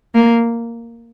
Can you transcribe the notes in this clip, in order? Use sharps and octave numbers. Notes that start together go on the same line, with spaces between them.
A#3